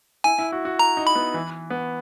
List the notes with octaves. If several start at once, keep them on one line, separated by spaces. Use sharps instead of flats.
E4 G#5
E4
F#4
F#4
A#5
D#4
B5
B3
E3
B3